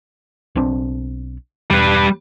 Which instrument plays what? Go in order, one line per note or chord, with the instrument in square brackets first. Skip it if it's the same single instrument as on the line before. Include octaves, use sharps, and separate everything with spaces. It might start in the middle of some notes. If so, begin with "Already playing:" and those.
[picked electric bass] B1 C4 D4
[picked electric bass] E1 [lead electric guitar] G3 B4